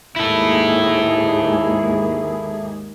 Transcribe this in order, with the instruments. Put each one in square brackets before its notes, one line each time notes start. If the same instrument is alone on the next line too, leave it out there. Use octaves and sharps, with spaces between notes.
[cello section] D#2 G#2 G#4 [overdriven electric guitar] E4 A4